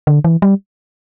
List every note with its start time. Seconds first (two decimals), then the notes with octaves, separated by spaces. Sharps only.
0.07 D3
0.24 E3
0.42 G3